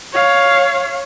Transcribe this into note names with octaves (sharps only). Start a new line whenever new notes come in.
C#5 F5